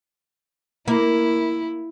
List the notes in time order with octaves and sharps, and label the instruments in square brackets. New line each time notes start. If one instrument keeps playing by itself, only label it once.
[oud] A#3 [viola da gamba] E4